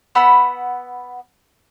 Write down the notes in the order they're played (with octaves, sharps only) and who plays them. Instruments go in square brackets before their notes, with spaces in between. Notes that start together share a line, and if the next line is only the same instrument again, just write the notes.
[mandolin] B3 F#5 B5 E6